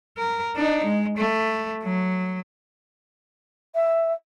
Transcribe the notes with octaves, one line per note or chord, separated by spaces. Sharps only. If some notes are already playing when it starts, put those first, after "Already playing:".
A#4
D4 D#4
G#3
A3
F#3
E5